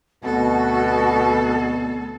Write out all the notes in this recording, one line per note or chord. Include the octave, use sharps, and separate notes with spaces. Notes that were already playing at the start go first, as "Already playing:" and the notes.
D2 B2 B3 C4 F#4 A4